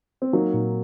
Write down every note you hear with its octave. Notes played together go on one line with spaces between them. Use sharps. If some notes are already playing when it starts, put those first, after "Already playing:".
C4
F#3 A#3 D#4
A#2